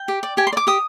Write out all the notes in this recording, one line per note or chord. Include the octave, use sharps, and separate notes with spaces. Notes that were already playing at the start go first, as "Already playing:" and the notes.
Already playing: G5
G4
D5
G4 G#5
C6
D5
D6
G4 D#6